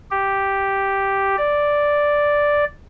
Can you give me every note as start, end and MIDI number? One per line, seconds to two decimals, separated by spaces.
0.11 1.36 67
1.38 2.64 74